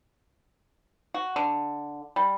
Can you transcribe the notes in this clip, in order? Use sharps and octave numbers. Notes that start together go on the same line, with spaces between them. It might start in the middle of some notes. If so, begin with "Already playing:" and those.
F#4
D3
G3